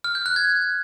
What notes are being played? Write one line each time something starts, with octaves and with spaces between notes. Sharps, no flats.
F6
G6
F#6
G#6